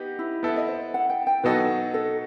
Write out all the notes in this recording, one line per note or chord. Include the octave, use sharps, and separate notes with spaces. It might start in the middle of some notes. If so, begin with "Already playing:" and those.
Already playing: B3 D#4 G4
E4
B3 E4 A4
D#5
C5
F#5
G5
G5
B2 F#3 B3 D#4 A4 B4
A4